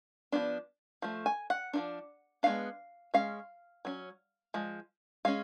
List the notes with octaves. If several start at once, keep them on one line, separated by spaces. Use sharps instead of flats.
F3 B3 D4
F3 A3
G#5
F#5
F3 A3 D4
G#3 B3 D4 F5
G#3 C#4 F5
F#3 C#4
F3 G#3
G#3 C#4 F5